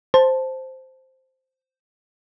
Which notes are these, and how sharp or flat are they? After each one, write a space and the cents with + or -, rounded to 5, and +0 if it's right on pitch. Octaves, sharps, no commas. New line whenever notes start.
C5 +0 A5 +0